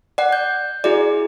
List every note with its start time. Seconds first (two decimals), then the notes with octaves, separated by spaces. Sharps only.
0.18 D5 F#5
0.33 G6
0.84 E4 F#4 G#4 D5